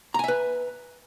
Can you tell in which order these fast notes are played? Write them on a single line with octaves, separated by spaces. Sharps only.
A#5 G#5 E5 B4